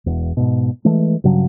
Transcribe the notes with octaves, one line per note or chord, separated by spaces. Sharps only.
E1 E2
G#2 B2
E3 G#3 A3
G2 C#3 F#3